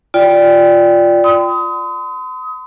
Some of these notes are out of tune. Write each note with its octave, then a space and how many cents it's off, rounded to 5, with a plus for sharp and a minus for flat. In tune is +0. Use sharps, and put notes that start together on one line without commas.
F4 +0 D5 +0 G5 +0
C6 -45 D#6 +25